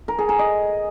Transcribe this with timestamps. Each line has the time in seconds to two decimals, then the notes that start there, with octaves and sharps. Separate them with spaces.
0.08 A#4
0.18 G#4
0.29 A#4
0.39 D#5